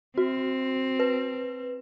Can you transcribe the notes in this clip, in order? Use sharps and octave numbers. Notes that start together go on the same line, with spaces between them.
C4 F#4
B4